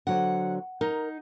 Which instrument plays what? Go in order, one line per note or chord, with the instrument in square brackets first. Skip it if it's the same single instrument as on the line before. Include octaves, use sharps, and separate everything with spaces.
[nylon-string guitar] D3 F#3 C5 [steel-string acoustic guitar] F#5
[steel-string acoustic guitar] D#4 [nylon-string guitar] A#4